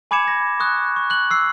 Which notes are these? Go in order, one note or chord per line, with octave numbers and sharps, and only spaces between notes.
G#5 B5 D6 G#6 C#7 E7
A#6
C#6 D#6 F#6
C#6
F#6 F#7
E6 C7